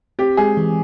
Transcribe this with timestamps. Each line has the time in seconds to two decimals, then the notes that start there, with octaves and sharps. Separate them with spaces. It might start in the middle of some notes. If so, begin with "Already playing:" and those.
0.19 C4 G4
0.37 G#3 G#4
0.57 E3